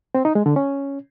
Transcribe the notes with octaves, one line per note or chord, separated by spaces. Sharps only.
C4
D#4
G#3
D3
C#4